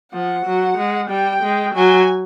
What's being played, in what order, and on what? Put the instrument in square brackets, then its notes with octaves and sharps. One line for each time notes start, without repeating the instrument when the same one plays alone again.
[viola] F3 [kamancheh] F#5
[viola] F#3
G#3
[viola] G3 [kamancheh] G5
[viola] G#3
[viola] F#3 [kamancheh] G#5